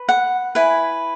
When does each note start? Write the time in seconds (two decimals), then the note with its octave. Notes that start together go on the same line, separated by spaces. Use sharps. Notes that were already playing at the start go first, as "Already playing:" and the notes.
Already playing: B4
0.09 F#5
0.55 E4 B4 G#5